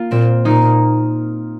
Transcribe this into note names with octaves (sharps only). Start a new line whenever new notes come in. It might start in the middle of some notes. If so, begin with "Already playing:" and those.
Already playing: A#3 F4
A#2 C4
A#2 A#3 D#4